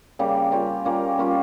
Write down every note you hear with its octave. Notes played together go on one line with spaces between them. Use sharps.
C#3 G3 A#3
G3 A#3 C#4 F4
G3 A#3 C#4 F4
G3 A#3 C#4 F4